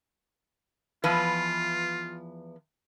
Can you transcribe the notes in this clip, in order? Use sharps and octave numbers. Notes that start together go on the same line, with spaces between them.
E2 F3 F4 B4